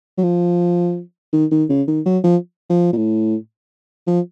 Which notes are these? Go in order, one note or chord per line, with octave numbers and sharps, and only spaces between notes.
F#3
F3
D#3
D#3
C#3
D#3
F#3
F3
F3
A#2
A2
F3